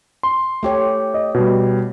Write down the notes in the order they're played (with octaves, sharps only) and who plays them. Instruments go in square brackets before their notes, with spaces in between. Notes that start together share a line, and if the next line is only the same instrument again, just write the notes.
[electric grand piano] C6
[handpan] A3 G4 C#5
[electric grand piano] D#5
B2 G3